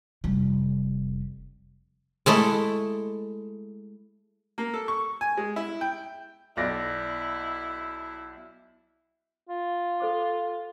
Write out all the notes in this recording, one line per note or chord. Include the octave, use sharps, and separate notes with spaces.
F1 G3
G#3 A3 E4 A4
A#3
A4
C#6
G#5
G#3
E4
G5
B1 E4 D5 A#6
F4
A4 C5 D6